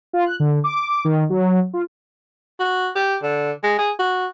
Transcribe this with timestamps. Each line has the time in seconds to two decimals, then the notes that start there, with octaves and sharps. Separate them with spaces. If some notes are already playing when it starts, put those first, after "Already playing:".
0.13 F4
0.26 F#6
0.40 D3
0.64 D6
1.05 D#3
1.30 F#3
1.73 F4
2.59 F#4
2.96 G4
3.23 D3
3.64 G#3
3.78 G#4
3.99 F#4